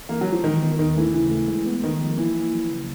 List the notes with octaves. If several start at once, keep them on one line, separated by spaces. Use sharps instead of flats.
E3 A#3
F#3
G#3
F3
D#3 E3
B3
D#2 D#3
E3 A3
C#3 E3
A3
G#3
B3
D#3 B3
F3
E3 A#3
A#3
F#3
C#3